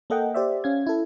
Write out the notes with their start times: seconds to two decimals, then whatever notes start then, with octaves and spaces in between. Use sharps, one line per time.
0.10 A#3 A4 D#5 F#5 G5
0.34 G4 C5 D5 E5
0.64 C#4 F5 G#6
0.86 E4 A4